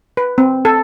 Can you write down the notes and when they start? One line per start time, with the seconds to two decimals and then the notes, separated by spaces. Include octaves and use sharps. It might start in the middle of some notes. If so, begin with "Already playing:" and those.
0.17 B4
0.38 C4
0.65 A4